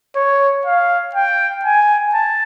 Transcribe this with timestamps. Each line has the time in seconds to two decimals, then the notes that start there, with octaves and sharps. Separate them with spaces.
0.16 C#5
0.66 F5
1.15 G5
1.65 G#5
2.14 A5